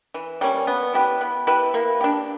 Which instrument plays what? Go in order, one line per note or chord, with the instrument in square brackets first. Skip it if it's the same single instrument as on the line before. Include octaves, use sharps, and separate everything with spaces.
[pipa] E3
G3 A#3 C#4
B3
E4 G4 B4
B3
E4 G4 B4
A#3
D4 G4